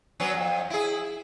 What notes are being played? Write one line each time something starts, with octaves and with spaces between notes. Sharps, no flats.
F#3 B3 C#4
F2
E4 G#4